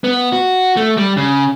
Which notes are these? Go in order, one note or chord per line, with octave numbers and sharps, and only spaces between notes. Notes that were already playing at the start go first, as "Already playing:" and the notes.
B3
F#4
A3
G3
C#3